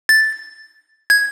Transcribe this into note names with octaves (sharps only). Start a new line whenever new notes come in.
A6
G#6